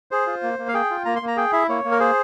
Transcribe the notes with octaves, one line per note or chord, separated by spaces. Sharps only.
G#4 C5
F4
A#3
A#3
F5
G#4 G5
F4
A#3 A#5
C6
A#3
A#5
G#4 G5
E4 E5
A#3 C#5
A#3
A#4
G#4 C5